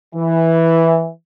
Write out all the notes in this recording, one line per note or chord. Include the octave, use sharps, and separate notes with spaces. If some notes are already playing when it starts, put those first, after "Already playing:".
E3